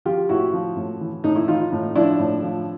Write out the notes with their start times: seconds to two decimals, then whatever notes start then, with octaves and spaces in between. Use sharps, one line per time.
0.05 F3 F4 G4
0.29 A2 E4 F#4
0.53 F3
0.77 A2
1.01 E3
1.24 A2 D#4
1.36 E4
1.48 E3 D#4 F4
1.72 A2
1.95 F3 D4 E4
2.20 A2
2.43 F3